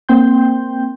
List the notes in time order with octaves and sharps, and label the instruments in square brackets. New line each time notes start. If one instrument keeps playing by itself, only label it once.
[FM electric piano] A#3 C4 G5 C6 G6